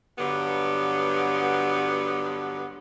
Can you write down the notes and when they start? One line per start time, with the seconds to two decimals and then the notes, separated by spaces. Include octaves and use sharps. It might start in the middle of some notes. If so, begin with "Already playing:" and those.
0.19 G2 D3 F#3 B3